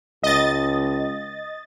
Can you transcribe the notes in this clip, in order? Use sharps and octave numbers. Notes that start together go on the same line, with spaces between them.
C#2 D#5 A6